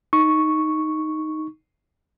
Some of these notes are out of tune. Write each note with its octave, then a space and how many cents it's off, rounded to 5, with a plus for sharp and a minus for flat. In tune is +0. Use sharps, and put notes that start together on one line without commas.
D#4 +0 C#6 +0